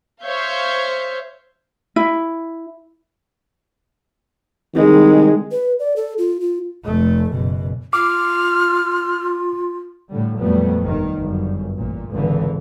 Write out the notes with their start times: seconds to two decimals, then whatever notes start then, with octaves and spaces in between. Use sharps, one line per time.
0.24 C5 C#5 E5 F5 G6
1.96 E4
4.76 C2 D#3 G#3
5.51 B4
5.79 D5
5.96 A4
6.18 F4
6.41 F4
6.84 F1 A3
7.30 F#1 B2
7.93 F4 D6 F6
10.10 A2 D3 G3
10.40 F2 A#2 F#3 G3 A3 B3
10.84 G1 D#3
11.18 G1 F#2
11.77 A1 A#2
12.11 G#1 C#2 D3 E3